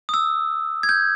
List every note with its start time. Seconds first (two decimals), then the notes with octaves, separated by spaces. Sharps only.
0.09 D#6
0.14 E6
0.83 G#6
0.89 G6